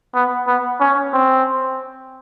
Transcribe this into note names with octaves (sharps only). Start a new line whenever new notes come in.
B3
B3
C#4
C4